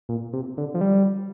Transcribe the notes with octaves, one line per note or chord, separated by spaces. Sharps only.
A#2
C3
D3
F3
G3